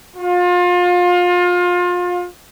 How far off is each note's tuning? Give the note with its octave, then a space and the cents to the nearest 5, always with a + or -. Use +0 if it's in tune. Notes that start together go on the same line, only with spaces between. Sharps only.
F4 +30